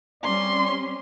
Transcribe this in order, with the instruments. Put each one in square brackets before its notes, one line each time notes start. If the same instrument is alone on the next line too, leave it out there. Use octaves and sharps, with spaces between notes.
[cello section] G3 C4 C#4 [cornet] D5 [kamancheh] C6